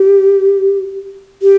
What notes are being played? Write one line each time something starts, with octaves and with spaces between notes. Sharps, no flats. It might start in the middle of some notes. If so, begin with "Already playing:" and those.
Already playing: G4
G4